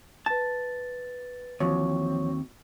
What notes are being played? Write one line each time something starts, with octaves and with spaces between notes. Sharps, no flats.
B4 A5 A6
D#2 E3 F3 C4 F#4 C#5 C#6